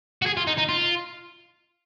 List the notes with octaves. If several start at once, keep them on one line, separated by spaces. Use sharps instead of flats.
F#4
G#4
F4
D#4
D#4
F4